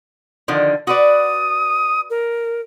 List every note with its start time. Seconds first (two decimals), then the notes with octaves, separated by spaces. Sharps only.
0.48 D3 D#3 F3
0.87 F#4 B4 D5 D#6
2.10 A#4